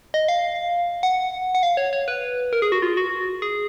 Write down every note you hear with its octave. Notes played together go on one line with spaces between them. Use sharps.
D#5
F5
F#5
F#5
F5
C#5
C#5
B4
A#4
G#4
F#4
F4
F#4
G#4